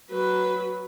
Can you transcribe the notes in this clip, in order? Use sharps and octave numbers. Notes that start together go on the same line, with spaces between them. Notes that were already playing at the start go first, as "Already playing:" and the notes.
F#3 B4